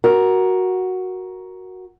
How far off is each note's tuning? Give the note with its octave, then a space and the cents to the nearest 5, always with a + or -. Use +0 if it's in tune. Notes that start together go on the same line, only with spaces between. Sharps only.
F#4 +0 A#4 +10